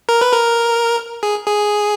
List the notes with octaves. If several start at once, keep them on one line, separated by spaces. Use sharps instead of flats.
A#4
B4
A#4
G#4
G#4